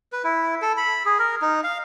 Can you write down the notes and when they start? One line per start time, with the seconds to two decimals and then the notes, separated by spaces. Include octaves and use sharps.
0.12 B4
0.24 E4
0.62 A4
0.77 B5
1.06 G#4
1.19 A#4
1.42 D#4
1.64 F5